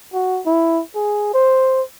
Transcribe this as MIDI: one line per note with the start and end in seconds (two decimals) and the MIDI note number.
0.13 0.41 66
0.46 0.81 64
0.95 1.33 68
1.34 1.82 72